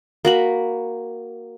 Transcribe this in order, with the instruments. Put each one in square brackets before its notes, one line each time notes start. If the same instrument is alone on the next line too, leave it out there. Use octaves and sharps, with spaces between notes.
[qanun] A#3 F#4 B5